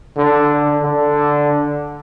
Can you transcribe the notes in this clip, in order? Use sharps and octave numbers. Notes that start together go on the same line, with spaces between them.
D3
D3